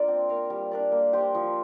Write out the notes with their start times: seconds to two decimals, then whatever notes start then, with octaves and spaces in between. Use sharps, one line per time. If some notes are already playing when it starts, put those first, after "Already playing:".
Already playing: A#3 D4 F4 A#4 D5
0.08 C4
0.29 A#4 F5
0.50 G3
0.72 D4 A#4 D5
0.92 A#3
1.13 G4 C5 F5
1.35 F3